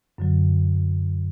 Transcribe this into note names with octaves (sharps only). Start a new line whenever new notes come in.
F#2 D3 F#3